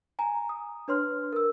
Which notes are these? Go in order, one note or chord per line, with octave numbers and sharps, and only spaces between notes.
G#5 A#5
D#6
D4 B4 C#5 C6 F6
A#4 E6